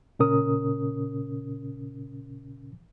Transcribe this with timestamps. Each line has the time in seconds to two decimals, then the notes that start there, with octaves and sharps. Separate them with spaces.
0.19 A#2 C#3 C#4 A#4 D#6